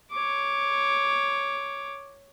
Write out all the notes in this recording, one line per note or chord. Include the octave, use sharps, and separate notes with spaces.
C#5 D6